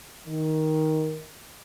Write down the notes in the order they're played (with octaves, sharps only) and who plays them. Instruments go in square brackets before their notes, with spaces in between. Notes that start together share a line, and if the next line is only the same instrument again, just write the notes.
[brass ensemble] D#3